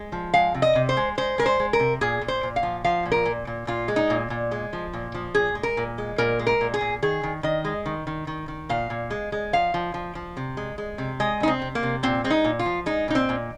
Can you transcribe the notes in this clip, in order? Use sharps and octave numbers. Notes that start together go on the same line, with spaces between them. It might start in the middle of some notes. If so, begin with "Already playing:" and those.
Already playing: G#3
F3
G#3 F5
C3
D#5
C3
C5
G#3
G#3 C5
G#3 A#4
C5
G#3
A#4
C3
A#2 G#4
A#2
C5
A#2
F5
F3
F3 F5
A#2
A#4
A#2
A#2
A#2 F4
G#3
D#4
A#2
A#2
G#3
F3
A#2
F3
A#2 G#4
G#3
A#4
A#2
G#3
A#2 A#4
G#3
A#4
A#2
G#4
A#2
D#3 G#4
D#3
D#3 D#5
G#3
D#3
D#3
D#3
D#3
A#2 F5
A#2
G#3
G#3
F3 F5
F3
F3
F3
C3
G#3
G#3
C3
G#3 D#5
C3 D#4
C4
C3
A#3
C3
A#2 C4
G#3 C4
D#4
A#2
F4
F3
G#3 D#4
A#2 D#4
C4
A#2